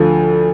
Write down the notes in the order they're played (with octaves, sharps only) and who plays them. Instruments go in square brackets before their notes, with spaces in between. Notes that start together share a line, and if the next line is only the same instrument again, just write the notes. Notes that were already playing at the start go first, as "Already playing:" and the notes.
Already playing: [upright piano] D2 D3 F3